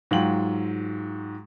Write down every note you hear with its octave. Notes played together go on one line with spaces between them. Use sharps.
G#2 F#3 F4 G5 F#7